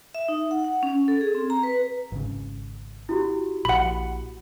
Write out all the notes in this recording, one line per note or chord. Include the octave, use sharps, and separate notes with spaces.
E5
D#4
F#5
F#5
C#4
A4
G#4
C4
A#5
B4
G#1 C#3
E4 F#4 G4
A#1 F#5 B5